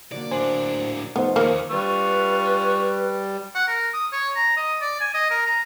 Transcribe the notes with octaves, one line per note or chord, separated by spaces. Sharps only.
D3 F#3 A#3 D5
A2 D4 C5 G#5
F2 A3 B3 D#4 F4 C5
D#2 A#3
G3 F4 B4 C#6 F6
F#5
A#4
D#6
C#5
A#5
D#5
D5
G#5
D#5
A#4
A#5